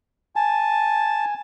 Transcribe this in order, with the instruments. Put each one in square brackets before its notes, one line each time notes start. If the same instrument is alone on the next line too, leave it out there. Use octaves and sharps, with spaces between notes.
[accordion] G#5 [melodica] A5